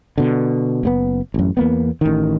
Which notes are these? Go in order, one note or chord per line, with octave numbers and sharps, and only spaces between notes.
B2 D3
F#1 C#3 B3
A1 F#2
E2 A#3 B3
A1 D#3